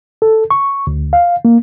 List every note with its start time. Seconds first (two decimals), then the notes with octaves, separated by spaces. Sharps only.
0.22 A4
0.51 C#6
0.87 D2
1.13 F5
1.45 A#3